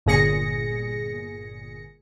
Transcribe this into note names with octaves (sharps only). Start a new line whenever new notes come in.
G1 A#2 G#4 A#6 C#7